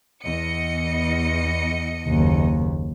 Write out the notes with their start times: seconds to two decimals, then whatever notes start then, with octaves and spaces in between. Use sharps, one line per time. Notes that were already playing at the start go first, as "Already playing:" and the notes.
0.22 E2 D#5 C#7
2.07 F#1 D#2